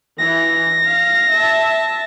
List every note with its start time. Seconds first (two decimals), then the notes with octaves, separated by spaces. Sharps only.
0.19 E3 A#6
0.87 F5
1.34 E5 A5